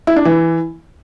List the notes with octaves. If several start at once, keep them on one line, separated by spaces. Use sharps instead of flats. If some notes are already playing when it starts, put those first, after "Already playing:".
E4
D4
E3